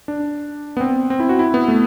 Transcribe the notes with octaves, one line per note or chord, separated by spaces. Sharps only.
D4
B3
C4
C4
E4
F#4
E4
B3
A3